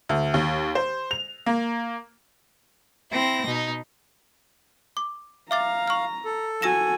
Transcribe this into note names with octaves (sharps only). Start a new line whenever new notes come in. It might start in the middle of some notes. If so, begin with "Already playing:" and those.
D2
D#2
C5
F7
A#3
C4 E4 A#6
B2 D#4
D6
E5 F5 A#5 D6 A6
C#6 F6
A4
F#4 G#5 E6 A#6 E7